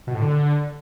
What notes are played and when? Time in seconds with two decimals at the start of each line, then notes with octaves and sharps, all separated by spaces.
0.07 B2
0.14 A2
0.21 D3